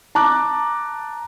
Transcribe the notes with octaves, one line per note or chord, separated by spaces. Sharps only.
A5 A#5 D6 F#6